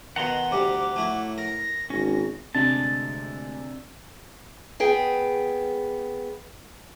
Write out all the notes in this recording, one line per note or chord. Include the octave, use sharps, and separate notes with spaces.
B2 D#3 F#5 A#5 C6
D2 C3 G3 D6
A2 A3 E4 F#4
A#4 A#6
G#1 C#4
D2 C3 G#3 D4 A5
B3 G#4 G5